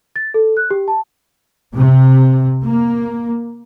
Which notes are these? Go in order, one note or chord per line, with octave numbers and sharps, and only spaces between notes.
A6
A4
F#6
G4
A5
C3
A#3